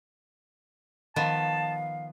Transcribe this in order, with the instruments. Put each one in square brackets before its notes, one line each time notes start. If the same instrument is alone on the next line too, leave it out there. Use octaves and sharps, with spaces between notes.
[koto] D#3 F3 B3 [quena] F5 [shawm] A5